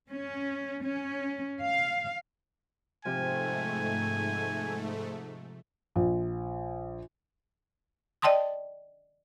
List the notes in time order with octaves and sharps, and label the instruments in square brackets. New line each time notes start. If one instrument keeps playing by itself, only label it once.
[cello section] C#4
C#4
F5
[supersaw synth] G#2 A3 [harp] C3 F3 [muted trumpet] G#5
[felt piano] A#1
[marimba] D5 D#5 G5 A5 C6 D#6